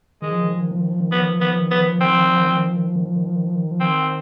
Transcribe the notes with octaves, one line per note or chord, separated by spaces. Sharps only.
D#3 G#3
F3
D#3
F3
D#3
F3
D#3
F3
D#3
F3 B3
D#3
F3
D#3 B3
F3
D#3
F3 B3
D#3
F3
D#3 C4
F3
D#3
F3
D#3
F3
D#3
F3
D#3
F3
D#3
F3
D#3
F3
D#3
F3
D#3
F3
D#3 C4